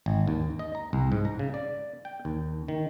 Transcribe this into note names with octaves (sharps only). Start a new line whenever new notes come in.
G#1
D#2
D#5
A#5
C2
G#2
A#5
C#3
D5
G5
D#2
D#3